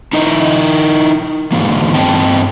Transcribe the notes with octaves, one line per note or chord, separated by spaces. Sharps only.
D#4 E4 A#4 D#5
G#2 D3 E3 A#3
G2 B3 C4 D#5 G5 A5